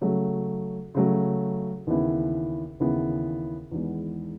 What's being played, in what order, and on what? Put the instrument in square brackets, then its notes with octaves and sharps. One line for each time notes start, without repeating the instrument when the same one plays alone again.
[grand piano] C#3 F#3 A3
C#3 F#3 A3
D#2 C#3 E3 B3 E4
D#2 C#3 E3 B3 E4
E2 D#3 G#3 B3